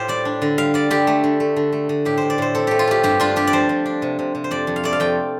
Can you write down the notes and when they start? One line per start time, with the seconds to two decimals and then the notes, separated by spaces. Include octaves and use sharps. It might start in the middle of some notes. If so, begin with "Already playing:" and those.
Already playing: A2 A3 F4 G4 C5
0.08 G3 D5
0.25 D4
0.42 D3
0.58 G3 F5
0.74 G3 D5
0.90 D3 G4
1.07 A3
1.24 D3
1.40 A3
1.56 D3
1.72 A3
1.89 D3
2.05 A2 G4
2.17 A2 C5
2.30 D5
2.38 A2 C5
2.55 C4 A4
2.67 A3 G4
2.79 F4
2.87 A3 G4
3.03 G2 G4
3.20 D4 F4
3.36 D4 G4
3.47 D5
3.53 F3 C5
3.69 F3
3.85 D4
4.02 C3
4.19 C3
4.35 C3
4.44 C5
4.51 F2 D5
4.67 F2
4.76 F5
4.83 A3 D5
4.93 F5
5.00 F2 G5